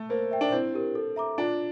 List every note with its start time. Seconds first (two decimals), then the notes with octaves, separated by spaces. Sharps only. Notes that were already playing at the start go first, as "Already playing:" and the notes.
Already playing: A3
0.09 A#3 C5
0.31 E5 G5
0.41 D4
0.52 C4 E4
0.74 G4 A#4
0.95 A4
1.16 E5 A#5 D6
1.38 D4 F4